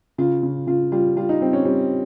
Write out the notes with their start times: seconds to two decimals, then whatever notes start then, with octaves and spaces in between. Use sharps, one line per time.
0.18 C#3 F4
0.43 C#3
0.67 C#3 F4
0.92 G3 F4
1.17 G3 F4
1.29 D#4
1.41 G3 C4
1.53 C#4
1.65 G3 C4